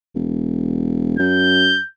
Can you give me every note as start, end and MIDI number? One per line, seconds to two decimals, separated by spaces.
0.15 1.19 28
1.19 1.77 42
1.19 1.87 91